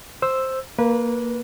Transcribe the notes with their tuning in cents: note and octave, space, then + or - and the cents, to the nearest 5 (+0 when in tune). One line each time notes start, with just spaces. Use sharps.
C5 +5 E6 +0
A#3 +0 B4 -20